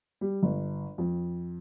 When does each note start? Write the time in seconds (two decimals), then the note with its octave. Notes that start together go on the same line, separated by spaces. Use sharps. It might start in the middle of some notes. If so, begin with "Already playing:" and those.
0.21 G3
0.42 G1
0.98 F2